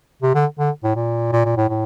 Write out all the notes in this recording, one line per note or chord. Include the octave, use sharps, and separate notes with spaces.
C3
D3
D3
A2
A#2
A#2
A#2
A2
A2